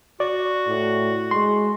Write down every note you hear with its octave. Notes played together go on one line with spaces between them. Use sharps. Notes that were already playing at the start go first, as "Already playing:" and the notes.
F#4 D5
A2
G#3 C6